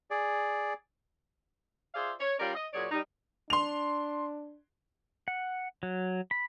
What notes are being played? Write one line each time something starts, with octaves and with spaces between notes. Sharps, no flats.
G#4 D5
F4 G#4 C5 D5 E5 F5
C#5
G3 C#4 F4 A#4 D5
D#5
A#2 F#3 G#4 C#5 D5
G3 D#4
D4 C6 F7
F#5
F#3
B5